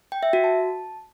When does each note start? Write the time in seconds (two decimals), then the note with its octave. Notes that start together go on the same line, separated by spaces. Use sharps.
0.12 G5
0.23 E5
0.33 F#4
0.44 A5